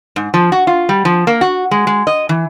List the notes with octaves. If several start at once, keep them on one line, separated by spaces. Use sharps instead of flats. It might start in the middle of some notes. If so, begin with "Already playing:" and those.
G#2
F3
F#4
F4
G3
F3
A#3
F#4
G#3
G#3
D#5
E3